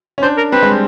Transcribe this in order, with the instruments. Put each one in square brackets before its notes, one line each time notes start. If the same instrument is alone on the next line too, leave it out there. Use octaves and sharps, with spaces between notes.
[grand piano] C#4
[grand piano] D4 [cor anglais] C5
[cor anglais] A#4
[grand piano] C4 [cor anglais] B4
[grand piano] G#3
G3